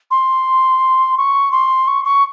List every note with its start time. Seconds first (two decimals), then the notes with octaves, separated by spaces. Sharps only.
0.11 C6
1.17 C#6
1.51 C6
1.87 C#6
2.05 C#6